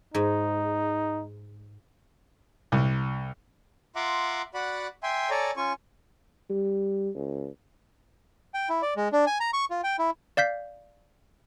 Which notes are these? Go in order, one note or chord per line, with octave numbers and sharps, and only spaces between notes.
G#2 D#4
C2
F4 E5 F#5 A#5 C6 D6
F#4 D5 F#5 B5
E5 G5 G#5 C6
A4 C#5 D5 G#5 A#5
C#4 F4 G#5 C#6
G3
C#2
G5
E4
D5
G#3
D4
G#5
A#5
C#6
F4
G5
E4
D5 F5 G6 B6